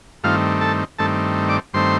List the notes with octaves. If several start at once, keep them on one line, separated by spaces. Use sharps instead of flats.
G2 D#3 A3 C4 F4 F5
A4 A5
G2 D#3 A3 C4 A4 A5
D5 D6
G2 D#3 A3 C4 C5 C6